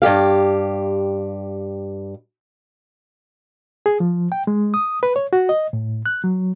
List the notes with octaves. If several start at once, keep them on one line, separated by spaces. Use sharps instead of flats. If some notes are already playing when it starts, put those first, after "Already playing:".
G2 C3 G4 F5
G#4
F3
G5
G#3
D#6
B4
C#5
F#4
D#5
A2
F#6
F#3